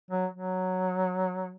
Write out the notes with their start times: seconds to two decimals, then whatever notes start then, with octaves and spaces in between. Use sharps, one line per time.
0.11 F#3
0.34 F#3